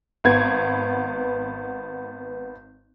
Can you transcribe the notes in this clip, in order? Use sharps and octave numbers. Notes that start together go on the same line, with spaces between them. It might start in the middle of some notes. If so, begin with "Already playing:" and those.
G#1 B3 G#6